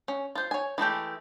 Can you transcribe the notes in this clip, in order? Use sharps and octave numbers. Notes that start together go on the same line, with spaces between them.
C#4
F4 C5
C#5 G#5
E3 G#3 A3 G4